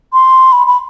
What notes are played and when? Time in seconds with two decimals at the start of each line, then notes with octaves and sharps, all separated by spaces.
0.13 C6
0.52 B5
0.67 B5